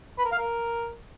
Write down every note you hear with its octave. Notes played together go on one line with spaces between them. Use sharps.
B4
A#4
F5
A#4